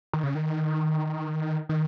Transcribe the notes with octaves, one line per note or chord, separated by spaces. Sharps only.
D#3
C#3
D#3
D#3